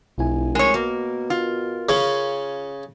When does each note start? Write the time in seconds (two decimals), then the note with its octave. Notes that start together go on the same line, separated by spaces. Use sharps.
0.18 F1 B1 E4 G#5
0.55 G#3 A#4 C#5
0.74 B2 A#3
1.30 F4
1.89 C#3 C#4